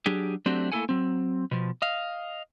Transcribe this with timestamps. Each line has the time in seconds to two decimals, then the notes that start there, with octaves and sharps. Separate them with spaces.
0.06 F#3 D4 G4 G#4
0.46 F#3 A3 C4 D4 F#4 G4
0.72 A3 A#3 E4 A4 F#5 G#5
0.89 F#3 C4
1.51 B2 F3
1.82 D#5 F5